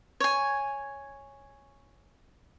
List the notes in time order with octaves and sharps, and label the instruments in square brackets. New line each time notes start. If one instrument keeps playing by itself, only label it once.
[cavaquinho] C#5 G#5